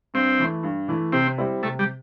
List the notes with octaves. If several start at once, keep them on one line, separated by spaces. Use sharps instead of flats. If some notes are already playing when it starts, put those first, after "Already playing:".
G2 C4
E3 A3 E4
G2
E3 A3 E4
C3 C4
G3 C4 E4
C3 A3
G3